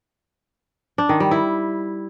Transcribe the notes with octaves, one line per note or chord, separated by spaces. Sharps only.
D4
D#3
G3
E4